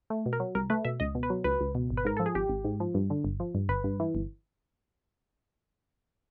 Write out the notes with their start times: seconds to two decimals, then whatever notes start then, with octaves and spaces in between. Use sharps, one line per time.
0.10 A3
0.26 B2
0.33 A#4
0.40 F#3
0.55 C2 A#4
0.70 A3 B4
0.85 B2 E5
1.00 C#2 D#5
1.15 B2
1.23 B4
1.30 F#3
1.44 C#2 B4
1.60 C#2
1.75 B2
1.90 G#1
1.97 B4
2.05 G#2 A#4
2.17 F3 A4
2.26 G#4
2.35 G#1 G4
2.49 G#1
2.65 G#2
2.80 F3
2.94 G2
3.10 D3
3.24 G1
3.40 F3
3.55 G2
3.69 G1 B4
3.84 G2
4.00 E3
4.15 G1